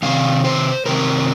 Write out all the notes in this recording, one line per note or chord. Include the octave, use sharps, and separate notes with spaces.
C3 D#3 C4 F5
C5
C3 D#3 C4 A#4